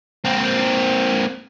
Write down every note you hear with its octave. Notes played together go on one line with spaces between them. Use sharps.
A#3 C4